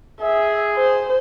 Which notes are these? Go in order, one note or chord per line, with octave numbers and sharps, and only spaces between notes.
G#4 E5
C5